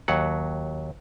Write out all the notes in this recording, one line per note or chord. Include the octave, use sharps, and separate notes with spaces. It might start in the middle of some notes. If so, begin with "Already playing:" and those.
D#2 F#3 F#5